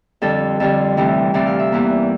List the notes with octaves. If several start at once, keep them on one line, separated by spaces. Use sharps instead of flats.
F2 D3 G3 A4
F2 D3 G3 A4
D2 C3 E3 G3
D2 C3 E3 G3 D5
F5
E5
E2 E3 A#3